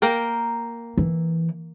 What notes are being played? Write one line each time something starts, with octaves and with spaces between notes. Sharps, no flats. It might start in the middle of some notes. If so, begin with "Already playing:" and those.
A#3 A#4 G5
E3